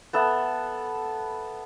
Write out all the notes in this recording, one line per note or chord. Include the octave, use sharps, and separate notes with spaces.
B3 A4 E5